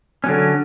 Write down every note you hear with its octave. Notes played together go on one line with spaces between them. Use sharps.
D3 F#3 C#4